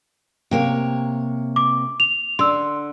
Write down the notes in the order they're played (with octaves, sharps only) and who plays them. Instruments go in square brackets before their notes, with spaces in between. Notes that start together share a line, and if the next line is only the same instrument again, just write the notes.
[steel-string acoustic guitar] C3 A#3 C#5
[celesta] D6
F7
[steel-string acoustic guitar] D3 [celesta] C6 E6